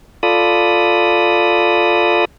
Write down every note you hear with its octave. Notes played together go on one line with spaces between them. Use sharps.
F4 A4 D5 B5 D#6